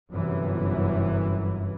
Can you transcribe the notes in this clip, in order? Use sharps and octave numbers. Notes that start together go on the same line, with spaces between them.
G1 F#2 C3 E3